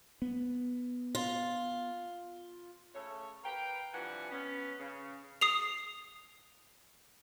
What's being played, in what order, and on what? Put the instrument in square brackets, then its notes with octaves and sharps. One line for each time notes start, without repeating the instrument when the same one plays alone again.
[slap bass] B3
[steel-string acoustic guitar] F4
[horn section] C#3 A3 A4 C#5
A#4 B4 F5 G5
G2 C3 E3 F3 F#5 G#5
B3 C#4
C#3
[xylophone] D#6 C7 F7